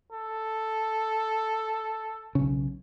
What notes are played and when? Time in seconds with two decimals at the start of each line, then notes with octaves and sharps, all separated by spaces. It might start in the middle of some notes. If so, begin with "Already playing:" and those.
0.12 A4
2.35 B1 C#3